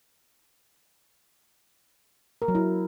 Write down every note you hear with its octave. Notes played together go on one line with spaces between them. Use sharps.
A#4
F#3
E4